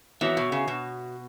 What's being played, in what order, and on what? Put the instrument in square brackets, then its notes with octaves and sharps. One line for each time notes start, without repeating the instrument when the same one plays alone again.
[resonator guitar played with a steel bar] E3 [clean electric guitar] B3 F#4 C#5 E5
[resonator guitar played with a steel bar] B2
C#3
B2